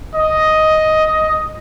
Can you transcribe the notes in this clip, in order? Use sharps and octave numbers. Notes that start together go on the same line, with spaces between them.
D#5